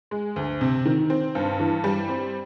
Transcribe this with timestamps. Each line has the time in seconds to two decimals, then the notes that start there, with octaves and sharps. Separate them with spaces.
0.11 G#3
0.36 D2
0.61 C3
0.85 D#3
1.10 C4
1.35 G2
1.60 E3
1.84 G3
2.09 C4